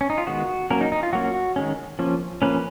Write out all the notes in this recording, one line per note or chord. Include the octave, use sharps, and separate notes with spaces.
C#4
D#4
F4
D#3 G#3 B3 F#4
F#3 A#3 C#4 A#4
D#4
D#4
F4
F#3 A#3 C#4 F#4
D#3 G#3 C#4
F3 A#3 C#4
F3 A#3 C#4 B4